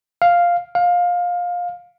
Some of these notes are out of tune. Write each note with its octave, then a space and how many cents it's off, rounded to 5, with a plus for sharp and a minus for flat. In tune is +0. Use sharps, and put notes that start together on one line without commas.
F5 +0
F5 +20